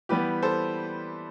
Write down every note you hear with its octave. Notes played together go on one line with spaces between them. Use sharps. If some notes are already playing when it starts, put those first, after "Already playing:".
E3 G3 B3 G4 B4
A4 C5